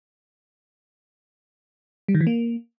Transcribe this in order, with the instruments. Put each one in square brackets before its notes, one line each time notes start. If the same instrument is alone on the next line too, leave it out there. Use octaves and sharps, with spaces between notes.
[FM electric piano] G3
D#3
E3
A#3